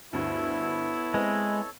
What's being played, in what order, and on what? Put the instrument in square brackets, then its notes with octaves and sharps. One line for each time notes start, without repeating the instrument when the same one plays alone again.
[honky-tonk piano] D2 G2 [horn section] B3 E4 [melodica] A4 C#5
[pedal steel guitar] G#3 [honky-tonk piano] C4 B4 D#5